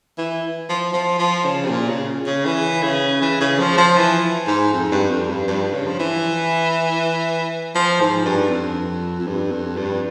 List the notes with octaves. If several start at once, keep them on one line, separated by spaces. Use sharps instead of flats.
E3
F3
F3
F3
C#3
C3
A#2
C#3
C#3
E3
C#3
E3
C#3
F3
F3
E3
G#2
F2
G2
F2
G2
G2
C#3
F3
E3
F3
G#2
G2
F2
F2
G2
F2
G2